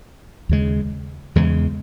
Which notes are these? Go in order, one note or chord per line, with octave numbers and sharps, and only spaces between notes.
D#2 C#3 G#3
E2 C#3 G#3